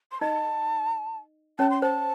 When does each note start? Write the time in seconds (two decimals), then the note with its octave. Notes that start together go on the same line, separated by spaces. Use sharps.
0.12 C6
0.21 D#4 D#5 A5
1.59 C#4 C#5 A5
1.70 C6
1.82 C5 A5